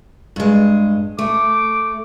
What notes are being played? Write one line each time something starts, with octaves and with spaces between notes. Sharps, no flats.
G2 G#3
A3 D6